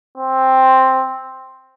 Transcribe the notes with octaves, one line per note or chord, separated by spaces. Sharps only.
C4